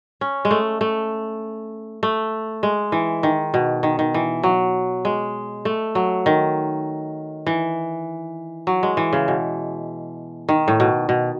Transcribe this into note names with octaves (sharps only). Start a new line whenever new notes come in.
C#4
G#3
A3
A3
A3
G#3
E3
D#3
B2
D#3
D#3
E3
F#3
G#3
A3
F#3
D#3
E3
F#3
G#3
E3
C#3
B2
D#3
A2
B2
B2